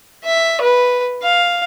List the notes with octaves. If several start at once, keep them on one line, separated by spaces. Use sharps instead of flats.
E5
B4
F5